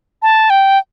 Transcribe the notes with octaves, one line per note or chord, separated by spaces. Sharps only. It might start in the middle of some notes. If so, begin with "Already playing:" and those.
A5
G5